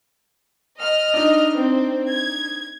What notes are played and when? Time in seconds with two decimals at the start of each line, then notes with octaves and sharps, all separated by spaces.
0.77 D#5 F6
1.14 D4 D#4
1.53 C4
2.06 G#6